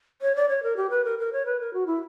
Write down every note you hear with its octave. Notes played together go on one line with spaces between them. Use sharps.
C#5
D5
C#5
A#4
G4
B4
A#4
A#4
C#5
B4
A#4
F#4
E4